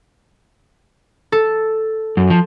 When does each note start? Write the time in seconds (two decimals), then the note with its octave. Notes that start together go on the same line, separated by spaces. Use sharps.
1.32 A4
2.17 F#2
2.30 F3